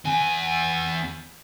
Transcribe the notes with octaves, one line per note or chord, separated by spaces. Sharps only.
E2 G#5